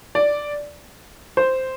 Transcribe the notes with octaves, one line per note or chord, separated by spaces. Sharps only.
D5
C5